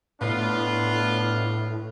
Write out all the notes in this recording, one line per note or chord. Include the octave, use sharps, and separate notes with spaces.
A2 B3 D4 F4